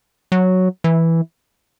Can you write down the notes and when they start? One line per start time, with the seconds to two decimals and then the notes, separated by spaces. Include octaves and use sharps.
0.32 F#3
0.84 E3